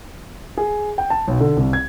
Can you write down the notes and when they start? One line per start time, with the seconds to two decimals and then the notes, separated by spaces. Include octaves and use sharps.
0.57 G#4
0.98 G5
1.10 A5
1.28 B1
1.40 D3
1.57 C2
1.73 G#6